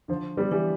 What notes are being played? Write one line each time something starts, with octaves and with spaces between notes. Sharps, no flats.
D3 F3
G3 B3
E3 G3